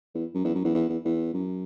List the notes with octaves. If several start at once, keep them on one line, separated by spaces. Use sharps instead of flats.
E2
F#2
E2
F#2
E2
E2
E2
E2
F#2